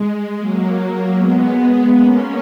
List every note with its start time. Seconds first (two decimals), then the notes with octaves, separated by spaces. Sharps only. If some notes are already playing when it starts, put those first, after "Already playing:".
Already playing: G#3
0.38 F#3 A#3
1.16 G#3 B3
1.94 A#3 C#4